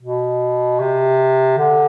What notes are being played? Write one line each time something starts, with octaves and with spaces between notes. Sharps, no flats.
B2
C3
D3